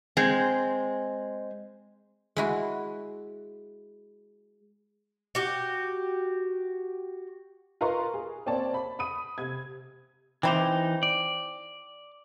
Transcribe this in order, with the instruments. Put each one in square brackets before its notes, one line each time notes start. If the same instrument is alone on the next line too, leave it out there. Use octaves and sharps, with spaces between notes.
[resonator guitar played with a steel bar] G#3 C4
[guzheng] G#3 E4 F#4
[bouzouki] F#4 G4
[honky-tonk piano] F4 A#4 B4 A#5 C6 C#6
G#4
A#3 C4 C#5 D5 A5
B5
B5 D#6 D#7
C3 G#6
[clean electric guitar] E3 D#4 [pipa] C4 E4 G4
[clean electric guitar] D5